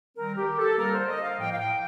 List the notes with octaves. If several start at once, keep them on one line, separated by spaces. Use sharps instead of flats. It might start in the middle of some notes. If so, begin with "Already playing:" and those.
D#3 G3 C4 A#4
G4
A4
D3 G3 A#3 A#4
C5
D#5
F5
A2 F3 A#3 G5
F5
G5